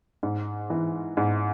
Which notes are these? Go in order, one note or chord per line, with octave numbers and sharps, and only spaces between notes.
G#2
E3
G#2